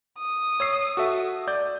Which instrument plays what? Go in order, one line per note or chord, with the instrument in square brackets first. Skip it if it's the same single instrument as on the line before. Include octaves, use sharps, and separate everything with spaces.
[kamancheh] D#6
[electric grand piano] C#5 E6 C7
F#4 A4 E5
D5 G6